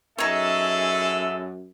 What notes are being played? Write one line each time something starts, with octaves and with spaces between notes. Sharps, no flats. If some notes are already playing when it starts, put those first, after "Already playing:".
F#2 G#3 D#4 G#4 A4 C#5 E5